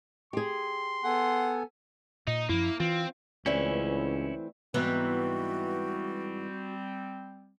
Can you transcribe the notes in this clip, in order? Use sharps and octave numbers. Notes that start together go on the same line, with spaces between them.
G4 G#4 C6
B3 A4 F#5 G#5
A#2 D#4 D#5
F#2 F3 A#3 E4
E3 C4 F4
C#2 E3 A3 C4 C#4 E4 D5
G#2 E3 G3 B3 C4 F#4